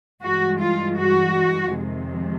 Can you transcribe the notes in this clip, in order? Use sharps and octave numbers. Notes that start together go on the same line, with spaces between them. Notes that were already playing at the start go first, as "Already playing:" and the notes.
G2 E3 G#3 F#4
F4
F#4
F2 C3 D#3 G#3